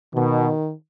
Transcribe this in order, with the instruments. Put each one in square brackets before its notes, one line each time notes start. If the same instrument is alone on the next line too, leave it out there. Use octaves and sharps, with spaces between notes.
[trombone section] B2 [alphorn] D#3